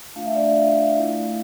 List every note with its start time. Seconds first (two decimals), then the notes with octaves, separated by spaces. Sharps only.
0.15 A3 D4 F4 F5
0.26 E5
0.35 D5
0.46 E5
0.56 F5
0.77 F5
0.97 A3 E4